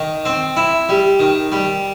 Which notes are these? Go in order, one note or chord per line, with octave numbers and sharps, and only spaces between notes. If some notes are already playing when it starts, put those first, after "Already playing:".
Already playing: D#3
C4
E4
G3
D#3
G3